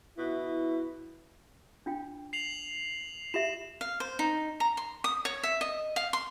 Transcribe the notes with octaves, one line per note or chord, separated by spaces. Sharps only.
B2 E4
D4 F4 G5
C7 F7 F#7
F4 G4 E5 E7
F5
C5
D#4
A#5
C6
D#6
C#5
E5
D#5
F5
C6